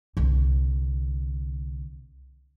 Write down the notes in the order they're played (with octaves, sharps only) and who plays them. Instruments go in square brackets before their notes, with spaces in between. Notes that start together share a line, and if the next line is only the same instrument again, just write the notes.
[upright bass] C2 D3